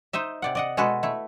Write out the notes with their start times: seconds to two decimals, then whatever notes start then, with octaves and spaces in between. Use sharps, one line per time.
0.13 D#4 C5 D#5 E5
0.42 C3 D5 F#5
0.55 D5 D#5 F#5
0.77 B2 G#3 F#4 A4 B4
1.03 A3 E4